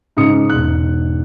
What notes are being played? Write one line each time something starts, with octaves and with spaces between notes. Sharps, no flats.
G#2 C#3 D#4 D#6 C#7
E1 G#2 F#6